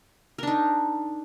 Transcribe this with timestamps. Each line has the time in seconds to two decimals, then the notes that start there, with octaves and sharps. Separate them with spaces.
0.38 A#4
0.43 D4
0.47 D#4